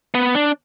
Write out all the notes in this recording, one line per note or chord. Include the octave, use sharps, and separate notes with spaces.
B3
D4